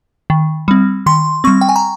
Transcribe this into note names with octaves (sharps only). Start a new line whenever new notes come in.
D#3
G3 C4
D#3 C6
G3 C4 C#6
G5
G#5
A#5